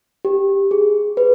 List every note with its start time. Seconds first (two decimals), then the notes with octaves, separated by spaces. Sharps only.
0.25 G4
0.71 G#4
1.17 B4